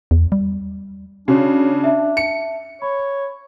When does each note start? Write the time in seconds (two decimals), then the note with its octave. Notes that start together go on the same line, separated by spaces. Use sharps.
0.11 E2
0.32 G3
1.28 C#3 D4 F#4 C#5
1.84 E5 A5
2.17 C#7
2.82 C#5 B5